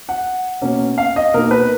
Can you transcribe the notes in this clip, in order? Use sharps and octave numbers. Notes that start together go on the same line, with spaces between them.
F#5
B2 A#3 C#4
F5
D#5
B2 A#3 D#4 A#4
B4